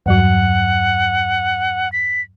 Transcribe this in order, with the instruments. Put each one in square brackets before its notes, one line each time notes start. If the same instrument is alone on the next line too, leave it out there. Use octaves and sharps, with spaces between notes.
[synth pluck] E2 G2 F#3 [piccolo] F#5
[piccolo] B6